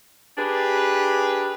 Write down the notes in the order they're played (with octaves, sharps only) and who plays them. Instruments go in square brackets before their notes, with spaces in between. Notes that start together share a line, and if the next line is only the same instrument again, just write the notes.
[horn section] D4 G4 G#4 B4